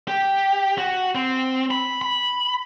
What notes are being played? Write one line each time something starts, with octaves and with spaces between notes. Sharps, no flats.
G4
F#4
C4
B5
B5